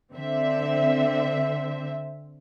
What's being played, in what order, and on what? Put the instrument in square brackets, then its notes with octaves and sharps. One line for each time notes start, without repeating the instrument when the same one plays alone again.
[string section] D3 C4 E5